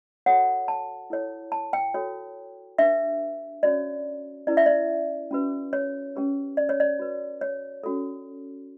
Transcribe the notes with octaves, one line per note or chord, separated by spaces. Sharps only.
F#4 A4 C#5 F#5
A5
E4 A4 C#5
A5
G5
F#4 A4 C#5
D4 G4 B4 E5
C#4 F#4 C#5 D5
C#4 E4 B4 D5
E5
D5
C#4 F#4 B4
C#5
C#4 G4 B4
D5
C#5
D5
F#4 B4
C#5
C#4 F#4 A4